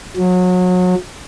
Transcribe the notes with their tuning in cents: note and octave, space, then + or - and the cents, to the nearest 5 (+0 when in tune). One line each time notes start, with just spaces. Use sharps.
F#3 -30